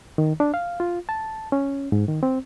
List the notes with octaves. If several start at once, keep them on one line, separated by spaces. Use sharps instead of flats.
D#3
D4
F5
F4
A5
C#4
G#2
D#3
C4